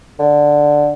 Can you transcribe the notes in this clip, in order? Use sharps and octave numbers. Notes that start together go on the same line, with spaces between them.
D3